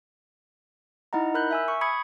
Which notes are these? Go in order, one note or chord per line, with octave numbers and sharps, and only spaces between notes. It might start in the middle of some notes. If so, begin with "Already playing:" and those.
D#4 E4 D#5 F#5 A#5
A#4 B5 F#6 G6
E5 G#5 E6
C#6
B5 D#6 G#6 C#7